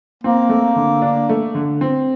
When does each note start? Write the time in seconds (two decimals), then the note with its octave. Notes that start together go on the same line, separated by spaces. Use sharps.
0.23 A#3 C4
0.49 A3
0.76 D3
1.02 D4
1.29 A3
1.55 D3
1.81 C4